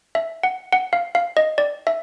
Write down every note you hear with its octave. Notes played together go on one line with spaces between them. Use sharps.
E5
F#5
F#5
F5
F5
D#5
D5
E5